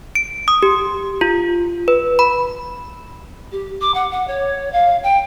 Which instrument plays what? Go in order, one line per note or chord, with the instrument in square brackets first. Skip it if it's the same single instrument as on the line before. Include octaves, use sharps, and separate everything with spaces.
[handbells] D7
D#6
G4
F4
B4
B5
[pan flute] G4
D6
F#5
F#5
C#5
F5
G5